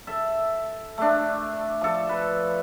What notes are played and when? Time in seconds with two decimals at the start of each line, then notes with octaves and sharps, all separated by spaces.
0.07 A4 E5
0.98 A3 D4
1.81 F3 A4
2.09 B4